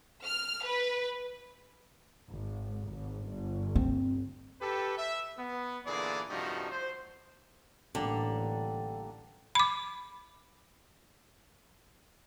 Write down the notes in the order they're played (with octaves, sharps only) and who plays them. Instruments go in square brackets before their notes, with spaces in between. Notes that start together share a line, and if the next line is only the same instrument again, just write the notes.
[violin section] F6
B4
[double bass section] G#1
G#1
G1
[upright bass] C4
[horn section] G4 A4 B4
E5
B3
A#2 D3 E3 G#4 D5
G2 C3 F3 A3 D#4 F#4
C5
[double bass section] A1 [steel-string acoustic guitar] D3 [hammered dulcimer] G3 A#3 A4 [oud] D4
[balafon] B5 D6